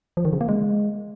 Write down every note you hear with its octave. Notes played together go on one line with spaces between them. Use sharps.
F3
D#3
C#3
A#3
G#3